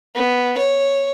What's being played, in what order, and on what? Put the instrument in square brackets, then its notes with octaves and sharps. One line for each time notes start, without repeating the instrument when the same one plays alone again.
[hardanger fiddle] B3
C#5